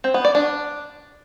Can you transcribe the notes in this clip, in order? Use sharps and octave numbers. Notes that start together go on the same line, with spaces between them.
C4
B3
D5
D4